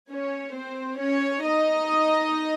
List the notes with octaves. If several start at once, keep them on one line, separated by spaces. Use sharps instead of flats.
C#4 C#5
C4 C5
C#4 C#5
D#4 D#5